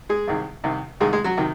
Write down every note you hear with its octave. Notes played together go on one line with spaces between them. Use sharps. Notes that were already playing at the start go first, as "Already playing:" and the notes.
G#3 G#4
C2 C3 D#3
C2 C3 D#3
C2 C3 D#3 G#3 G#4
G#3 G#4
F#3 F#4
C3 D#3